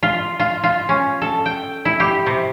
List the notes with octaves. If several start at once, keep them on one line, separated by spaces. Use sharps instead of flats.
F4
F4
F4
C#4
A4
G5
E4
G4
C3